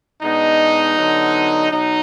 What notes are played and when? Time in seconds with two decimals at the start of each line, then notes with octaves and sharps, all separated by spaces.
0.22 B2 G#3 B3 D4 D#4
0.97 D3 F#3 B3
1.71 B2 F#3 D#4